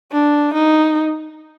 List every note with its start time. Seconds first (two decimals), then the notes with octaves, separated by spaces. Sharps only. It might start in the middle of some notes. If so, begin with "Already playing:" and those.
0.12 D4
0.54 D#4